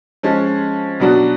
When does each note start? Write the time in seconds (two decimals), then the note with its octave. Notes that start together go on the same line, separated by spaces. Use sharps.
0.23 F3 G#3 C#4
1.00 B2 F#3 B3 D4 F#4